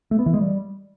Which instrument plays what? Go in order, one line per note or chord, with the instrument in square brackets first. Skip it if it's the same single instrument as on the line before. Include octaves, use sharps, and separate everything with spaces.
[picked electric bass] A3
B3
E3
G#3
G3